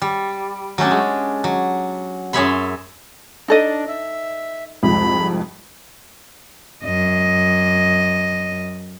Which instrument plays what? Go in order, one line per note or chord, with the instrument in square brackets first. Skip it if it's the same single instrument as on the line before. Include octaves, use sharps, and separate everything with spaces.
[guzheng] G3
F#3 A3 C#4 D4
G#3
F#3
F#2 G#4 C#5 E5 B5 C6
[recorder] D4 [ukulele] D#4 A4 D#5
[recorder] E5
[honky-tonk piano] C2 F2 G#2 [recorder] B5
[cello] F#2 D#5